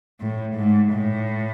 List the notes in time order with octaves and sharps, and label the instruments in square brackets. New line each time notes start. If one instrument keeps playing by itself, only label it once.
[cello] A2
G#2
A2